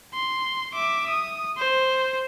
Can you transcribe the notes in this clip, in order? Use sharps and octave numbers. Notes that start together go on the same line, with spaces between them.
C6
E5 D6
D#6
C5